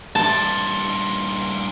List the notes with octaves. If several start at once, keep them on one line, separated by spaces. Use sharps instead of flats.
G2 A#2 A5